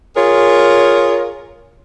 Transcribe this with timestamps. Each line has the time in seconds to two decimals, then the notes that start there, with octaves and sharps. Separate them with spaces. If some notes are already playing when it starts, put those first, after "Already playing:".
0.16 F4 G#4 A#4 C#5